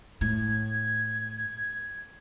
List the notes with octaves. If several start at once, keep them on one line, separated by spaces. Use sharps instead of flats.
A2 G#6